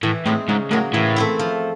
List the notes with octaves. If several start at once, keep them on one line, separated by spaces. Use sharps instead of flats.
A2 E3
A2 G#3 C4 D#4
G#2 C#3
A2 F#3 A#3
A2 E3
A3 C4 E4
F3